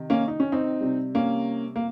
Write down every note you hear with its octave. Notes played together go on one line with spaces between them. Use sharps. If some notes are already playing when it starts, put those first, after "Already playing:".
Already playing: C3 D#3
A#3 C#4
D#4
C#4
C4 D#4
C3 G3
A#3 C#4
A#3